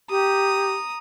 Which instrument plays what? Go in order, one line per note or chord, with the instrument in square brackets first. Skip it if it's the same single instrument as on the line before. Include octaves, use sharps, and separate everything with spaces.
[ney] G4 [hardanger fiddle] A#5 D#6